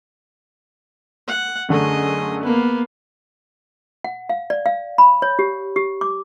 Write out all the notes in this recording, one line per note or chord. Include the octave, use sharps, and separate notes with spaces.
F#5
F#2 D3 A3 G#4 D#5
A#3 B3
F#5
F5
D5
F5
B5
C#5
G4
G4
D6